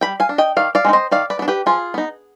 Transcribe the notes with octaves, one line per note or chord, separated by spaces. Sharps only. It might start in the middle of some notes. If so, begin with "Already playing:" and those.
G3 G5 B5
F5 G#5
D4
D#5 G5
D#3 D5 F5
D5 F5
G#3 C4 D#4
C5 D#5
D#3 D5 F5
B4 D5
B3 D4
G4 B4
F3 F4 G#4
B3 D#4